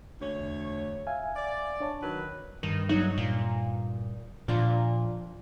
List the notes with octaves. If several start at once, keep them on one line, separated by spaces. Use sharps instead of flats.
D2 C#5
E2
E5 F5 G#5
D5
D4 C#5 A5
D#3 F#3 B4
G2 D#3
F#3 D#4
A#2
A#2 F3 D4 F4